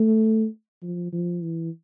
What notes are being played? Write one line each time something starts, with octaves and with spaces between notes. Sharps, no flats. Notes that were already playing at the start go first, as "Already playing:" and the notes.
Already playing: A3
F3
F3
E3